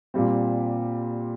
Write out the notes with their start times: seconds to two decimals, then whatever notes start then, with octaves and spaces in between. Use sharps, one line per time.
0.14 A#2 G3 C4